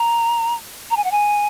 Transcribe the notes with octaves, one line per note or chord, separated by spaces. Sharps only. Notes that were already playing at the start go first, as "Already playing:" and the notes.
Already playing: A#5
A#5
G#5
F#5
G#5